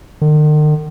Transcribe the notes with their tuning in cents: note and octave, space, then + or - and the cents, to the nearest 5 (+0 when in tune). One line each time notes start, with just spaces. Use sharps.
D#3 -45